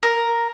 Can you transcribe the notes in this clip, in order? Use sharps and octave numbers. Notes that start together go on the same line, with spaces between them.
A#4